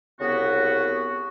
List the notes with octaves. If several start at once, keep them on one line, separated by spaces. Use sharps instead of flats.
C2 C#3 B3 F#4